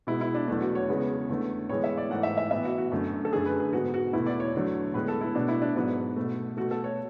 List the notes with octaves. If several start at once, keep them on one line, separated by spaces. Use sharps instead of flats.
B2 G#3 B3 E4
E4
D4
E2 B2 F#3 A3 D4
F#4
C#5
E2 C#3 G#3 B3
E2 D3 A3
A2 E3 G#3 B3 C#5
E5
D5
G#2 E3 A3 F#5
E5
E5
A2 E3 B3 E5
F#4
F#4
F#2 D3 A3
A4
F#2 D3 A3 G#4
B4
G#4
G#2 G#3 B3 F#4
F#4
E2 B2 A3 E4
D5
C#5
E2 D3 F#3 A3
A2 G#3 B3 B4
A4
E4
B2 A3 D4
E4
D4
G#2 F#3 B3
B2 A3
B2 A3 F#4
A4
C#5